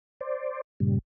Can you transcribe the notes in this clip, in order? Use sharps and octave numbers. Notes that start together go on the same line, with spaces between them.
C5 D5
G2 A#2 C#3 G3